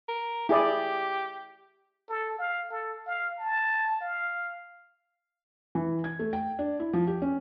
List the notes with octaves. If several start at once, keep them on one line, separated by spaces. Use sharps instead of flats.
A#4
E4 G4 G#4 D5
A4
F5
A4
F5
A5
F5
E3
G#6
A3
G5
D4
E4
F3
G4
C#4